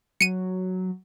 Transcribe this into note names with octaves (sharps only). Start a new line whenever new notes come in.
F#3 C#7 D#7